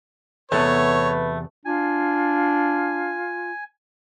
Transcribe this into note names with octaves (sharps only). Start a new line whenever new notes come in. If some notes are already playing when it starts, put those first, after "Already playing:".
E2 C3 A3 B3 B4 C#5
D4 F4 G#5